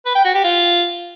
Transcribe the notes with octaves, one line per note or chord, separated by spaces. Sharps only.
B4
G5
F#4
G4
F4